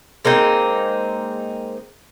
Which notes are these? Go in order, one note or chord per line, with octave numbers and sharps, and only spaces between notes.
G#3 A#3 C4 D#4